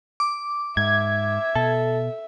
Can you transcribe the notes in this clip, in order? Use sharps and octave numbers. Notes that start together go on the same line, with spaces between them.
D6
G#2 E5 G#6
B2 A4